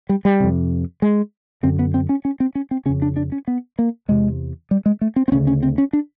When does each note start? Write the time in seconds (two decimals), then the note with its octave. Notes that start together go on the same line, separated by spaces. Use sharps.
0.09 G3
0.25 G3
0.40 F2 C3
1.02 G#3
1.63 F#2 D3 C4
1.79 B3
1.94 C4
2.09 C#4
2.25 C#4
2.40 C4
2.55 C#4
2.71 C4
2.86 C#3 C#4
2.89 F2
3.02 D4
3.17 D4
3.32 C#4
3.48 B3
3.79 A#3
4.08 E2 C3 G#3
4.71 G3
4.86 G#3
5.01 A3
5.16 C4
5.28 C4
5.32 D2 C#4
5.35 C#3
5.47 C#4
5.63 C4
5.78 C#4
5.93 D4